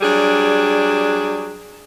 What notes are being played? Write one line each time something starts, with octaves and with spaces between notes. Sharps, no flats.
F#3 G3 D4 G#4